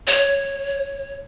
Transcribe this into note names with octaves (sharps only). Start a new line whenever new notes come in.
C#5